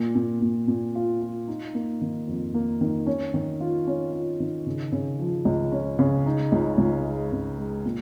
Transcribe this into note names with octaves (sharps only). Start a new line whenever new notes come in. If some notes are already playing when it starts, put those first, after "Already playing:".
Already playing: A#2
A#2
A#2
A#2
F4
F4
D#4
A#3
D#3
F2
A#3
D#3
C#4
D#3
F4
C#4
F4
D#3
C#3
C#3
F3
C#2
C#4
C#3
D#4
C#2
C#2
G#3
C#3
G#3
A#2